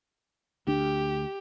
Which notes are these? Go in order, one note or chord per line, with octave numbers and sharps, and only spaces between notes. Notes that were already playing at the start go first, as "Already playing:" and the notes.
D2 D4 G4